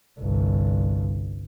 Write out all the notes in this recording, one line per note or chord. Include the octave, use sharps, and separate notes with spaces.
G1 C2